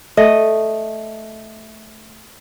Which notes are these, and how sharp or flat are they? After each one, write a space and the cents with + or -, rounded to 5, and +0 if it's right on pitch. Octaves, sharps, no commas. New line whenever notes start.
A3 -5 D#5 -5